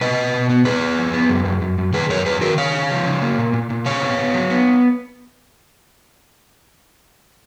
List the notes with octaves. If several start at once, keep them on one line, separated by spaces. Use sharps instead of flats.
B2 B4 D#5
B2
B2
B3
B3 G#4 B4
B3
F3
B3
F#2
F#2
F#2
F#2
D#3 G#4 B4
F#2 A#4 C#5
F#2 G#4 B4
D#3 F#4 A#4
C#3 C#5 F5
C#3
F3
C#3
A#3
A#2
A#2
A#2
C#3 C#5 F5
B3
B3
F#3
B3